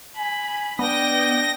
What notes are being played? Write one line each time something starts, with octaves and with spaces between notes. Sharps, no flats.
G#5 B5
B3 D4 D#5 G5 A#6